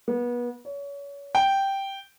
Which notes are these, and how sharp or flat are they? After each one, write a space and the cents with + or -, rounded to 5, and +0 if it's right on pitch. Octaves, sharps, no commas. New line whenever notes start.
B3 -30
C#5 +30
G5 -5